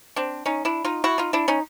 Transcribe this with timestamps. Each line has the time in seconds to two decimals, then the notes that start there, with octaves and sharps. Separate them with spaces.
0.16 C4 D4
0.46 C#4 D#4
0.65 D4 E4
0.85 D#4 F4
1.04 E4 F#4
1.18 D#4 F4
1.33 D4 E4
1.48 C#4 D#4